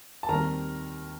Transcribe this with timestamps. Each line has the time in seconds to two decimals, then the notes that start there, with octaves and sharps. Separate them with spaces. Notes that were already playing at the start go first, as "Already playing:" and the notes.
0.23 A5
0.29 D#2 D#3 G3 C4 A#4 A#5